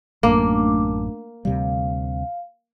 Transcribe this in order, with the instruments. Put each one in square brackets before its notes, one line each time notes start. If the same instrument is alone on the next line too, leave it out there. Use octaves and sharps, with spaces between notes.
[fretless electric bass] A1 F#2 [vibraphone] A3 D4 D6 [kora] A#3
[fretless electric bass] D2 C3 G3 [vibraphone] F5